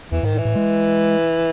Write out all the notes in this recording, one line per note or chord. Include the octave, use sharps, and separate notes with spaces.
E2 E3
G#2 D#3
A2
E3
A2
G#3